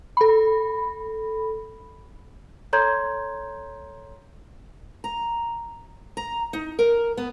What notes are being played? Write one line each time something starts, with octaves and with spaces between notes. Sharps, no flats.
A4 B5
A4 C#5 A#5 C6 G6 G#6
A#5
A#5
D#4
A#4
B3